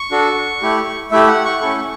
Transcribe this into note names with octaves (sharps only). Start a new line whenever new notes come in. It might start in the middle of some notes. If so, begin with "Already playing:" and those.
Already playing: C#6
D4 F#4 A4
A3 E4 G4
A3 E4 G4 E5
F#5
C#6
A3 C#4 E4 A4